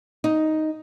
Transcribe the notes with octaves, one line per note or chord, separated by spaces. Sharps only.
D#4